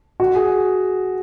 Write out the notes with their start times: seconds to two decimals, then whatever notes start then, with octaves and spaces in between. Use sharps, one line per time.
0.20 F#4
0.35 G#4